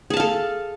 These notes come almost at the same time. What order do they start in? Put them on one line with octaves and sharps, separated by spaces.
G#4 A5 F5 A4